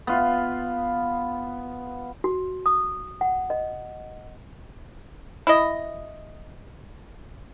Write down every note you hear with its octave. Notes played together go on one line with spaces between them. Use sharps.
B3 F4
F#4
D#6
F#5
D#5
E4 D#5